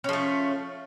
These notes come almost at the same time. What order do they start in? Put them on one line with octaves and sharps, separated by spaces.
C#4 F3 A3